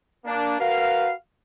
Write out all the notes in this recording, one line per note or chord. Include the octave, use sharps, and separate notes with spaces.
A#3 D4
F#4 A#4 B4 F5